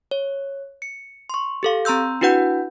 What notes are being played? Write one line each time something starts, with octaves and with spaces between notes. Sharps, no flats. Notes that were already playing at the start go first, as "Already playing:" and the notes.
C#5
C#7
C6 C#6
G4 A4 F5
C4 A#5 C6 E6 G6
D4 E4 F#4 B4 F#5 G6